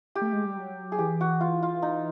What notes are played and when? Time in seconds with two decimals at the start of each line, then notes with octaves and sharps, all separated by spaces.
0.15 G4
0.21 A3
0.33 G#3
0.45 G3
0.57 F#3
0.92 G#4
0.99 E3 G4
1.21 F#4
1.41 F4
1.63 F4
1.82 D#4